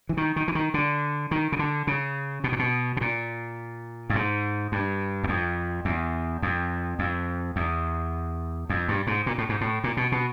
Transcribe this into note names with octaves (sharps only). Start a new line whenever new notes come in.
E3
D#3
D#3
E3
D#3
D3
D#3
C#3
D3
C#3
B2
A#2
B2
B2
A#2
G2
G#2
G2
E2
F2
E2
F2
F2
E2
F2
G2
G#2
A#2
A2
G#2
A2
A#2
B2
B2